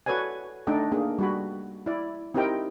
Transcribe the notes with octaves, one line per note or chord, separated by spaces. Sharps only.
F#4 A4 B4 C#5 D5 G#5
A3 D4 D#4 A4 G5
A#3 D4 G#4
G3 F#4 B5
E4 D5
C4 D#4 E4 G4 A#4 G5